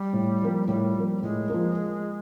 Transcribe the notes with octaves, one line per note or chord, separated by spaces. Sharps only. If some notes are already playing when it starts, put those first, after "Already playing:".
Already playing: G3
A2
F3 A#3
A2 G3
F3 A#3
A2 G#3
F3 A#3